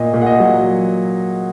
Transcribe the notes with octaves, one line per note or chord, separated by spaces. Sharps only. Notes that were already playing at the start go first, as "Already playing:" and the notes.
Already playing: A#2 D#5
A#2
F#5
D#5
F#3